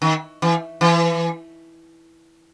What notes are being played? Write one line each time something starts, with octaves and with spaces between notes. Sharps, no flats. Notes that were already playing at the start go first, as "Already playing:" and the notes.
D#3
E3
E3